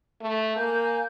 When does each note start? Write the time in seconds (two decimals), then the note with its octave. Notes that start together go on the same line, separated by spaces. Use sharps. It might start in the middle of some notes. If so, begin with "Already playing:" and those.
0.22 A3
0.56 A#3 G#5 G6